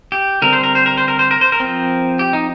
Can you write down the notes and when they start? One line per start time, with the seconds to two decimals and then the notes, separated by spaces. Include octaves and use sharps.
0.12 G4
0.42 D3 G3 C4 A#4
0.53 C5
0.63 A#4
0.75 C5
0.86 A#4
0.97 C5
1.08 A#4
1.19 C5
1.31 A#4
1.41 C5
1.52 A#4
1.60 F3 C4
2.19 G4
2.33 D#4